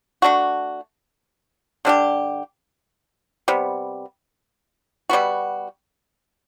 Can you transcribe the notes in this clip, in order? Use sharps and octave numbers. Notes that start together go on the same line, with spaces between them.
A3 D4 F#4
D3 G3 D4 G4
C3 G3 B3
B2 G3 B3 F#4